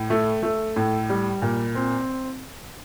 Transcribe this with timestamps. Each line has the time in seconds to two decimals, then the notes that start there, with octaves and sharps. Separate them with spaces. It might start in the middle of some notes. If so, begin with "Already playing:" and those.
Already playing: A2
0.10 A3
0.43 A3
0.76 A2
1.10 G3
1.42 A#2
1.75 C4